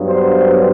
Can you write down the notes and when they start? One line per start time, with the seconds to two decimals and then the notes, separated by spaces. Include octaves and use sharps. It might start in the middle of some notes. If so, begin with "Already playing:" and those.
Already playing: G2 F#3 B3
0.08 C5